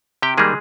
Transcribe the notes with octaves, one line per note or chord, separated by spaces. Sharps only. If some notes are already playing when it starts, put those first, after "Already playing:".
C3 G4 G5
D#3 G3 G#3 A#3 G#4